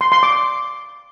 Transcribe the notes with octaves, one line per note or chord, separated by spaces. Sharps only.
C6
C6
D6